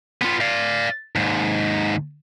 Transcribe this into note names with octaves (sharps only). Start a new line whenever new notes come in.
B3 F4
D5 F5
D#2 G#2